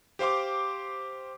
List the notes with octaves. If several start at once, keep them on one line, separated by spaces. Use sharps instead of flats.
G4 C5 F5 C6 D6